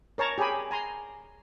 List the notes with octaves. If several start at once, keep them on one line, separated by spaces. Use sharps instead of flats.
A#4 C#5 A5 A#5
G4 G#4 C#5 G#5 B5
G#5 A#5 C6